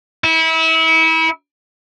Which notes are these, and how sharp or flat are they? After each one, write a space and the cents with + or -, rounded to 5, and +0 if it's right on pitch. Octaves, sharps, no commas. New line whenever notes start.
E4 -30